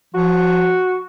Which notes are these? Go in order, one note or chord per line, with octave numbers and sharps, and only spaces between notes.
F3 F#4